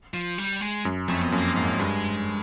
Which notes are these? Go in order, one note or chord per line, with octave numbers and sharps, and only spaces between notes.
F3
G3
G#3
F#2
F2 A3
B3
F#2 A#3
G#2 A#3
G2 G#3